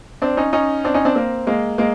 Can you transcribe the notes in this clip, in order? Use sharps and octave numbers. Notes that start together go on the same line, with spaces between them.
C4 D4
C#4 D#4
C#4 D#4
C4 D4
C#4 D#4
C4 D4
A#3 C4
G#3 A#3
G#3 A#3